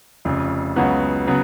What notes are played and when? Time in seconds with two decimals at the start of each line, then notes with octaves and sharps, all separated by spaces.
0.25 F1 F2 C#3
0.76 C#2 C#3 F#3 B3 F#4
1.27 C#3 F#3 B3